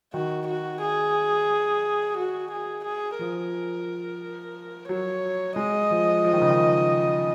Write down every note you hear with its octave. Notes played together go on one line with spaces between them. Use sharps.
D#3 F#4
F#4
G#4
F#4
G#4
G#4
F3 A#4
F#3 C#5
G#3 D#5
F3
F3
D#3
C#3
D#3